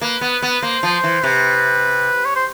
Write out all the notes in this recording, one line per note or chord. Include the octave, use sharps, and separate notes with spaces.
A#3 B4
B3
B3
A#3 C5
F3
E3
C3 B4
C#5
C5